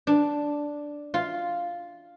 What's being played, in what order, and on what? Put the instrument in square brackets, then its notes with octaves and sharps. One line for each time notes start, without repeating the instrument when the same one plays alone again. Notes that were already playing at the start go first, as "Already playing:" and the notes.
[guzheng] D4
F4